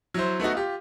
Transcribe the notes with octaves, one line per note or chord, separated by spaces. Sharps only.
F#3 E4 C5
A3 B3 D#4 F#4
F4 G4